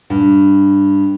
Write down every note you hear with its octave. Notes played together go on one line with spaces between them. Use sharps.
G2